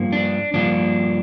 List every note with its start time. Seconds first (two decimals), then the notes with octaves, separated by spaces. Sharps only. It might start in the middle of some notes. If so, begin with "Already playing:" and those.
Already playing: G2 F3 A#3
0.12 D4
0.54 G2 F3 A#3 D4